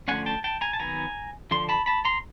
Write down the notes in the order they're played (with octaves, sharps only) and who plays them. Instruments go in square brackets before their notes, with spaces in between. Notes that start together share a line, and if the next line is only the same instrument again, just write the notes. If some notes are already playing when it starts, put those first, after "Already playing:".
[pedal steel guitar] D3 F3 A3 C#4 F#5 G#5
G5 A5
G5 A5
G#5 A#5
A5
D#3 F#3 B3 G#5 A#5
D3 F3 C6
A5 B5
A5 B5
A#5 C6